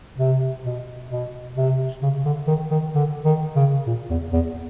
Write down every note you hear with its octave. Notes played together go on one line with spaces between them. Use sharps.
C3
B2
B2
C3
C#3
D3
D#3
D#3
D3
D#3
C#3
A#2
E2
E2